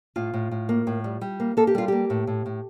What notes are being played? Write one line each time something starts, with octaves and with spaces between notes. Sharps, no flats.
A2 F4
A2
A2
A#3
A2
G3
G3
A#3
A#3 A4
G4
G3 F4
A#3 G4
A2
A2
A2